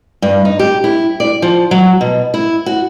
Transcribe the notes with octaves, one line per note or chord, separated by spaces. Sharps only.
G2
D#4
G4
E4
D5
F3
F#3
B2
E4
F#4